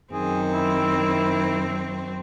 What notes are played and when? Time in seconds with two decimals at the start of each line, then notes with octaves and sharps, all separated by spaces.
0.12 F#2 D#3 C4 G#4
0.53 E4